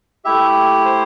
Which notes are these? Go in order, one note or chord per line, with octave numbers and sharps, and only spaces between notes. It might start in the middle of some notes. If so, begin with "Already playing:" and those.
A3 E4 G4 E5
C5